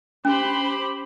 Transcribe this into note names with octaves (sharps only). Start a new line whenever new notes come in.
C#4 G4 C5 B5